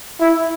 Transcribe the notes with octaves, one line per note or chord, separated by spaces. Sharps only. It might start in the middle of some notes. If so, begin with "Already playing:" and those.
E4